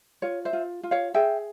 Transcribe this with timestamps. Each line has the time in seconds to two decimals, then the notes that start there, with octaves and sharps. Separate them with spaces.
0.22 F4 C#5
0.45 C5 E5
0.53 F4
0.83 F4
0.91 C#5 F5
1.14 G#4 E5 G5